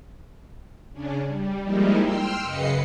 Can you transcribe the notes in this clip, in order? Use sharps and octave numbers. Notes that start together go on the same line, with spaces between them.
C#3 C#4 D4
G3
F3 G3 G#3 A#3 D#4 E4
G5 C6 E6 F6
F#2 C#3 B4 D#5 C7 C#7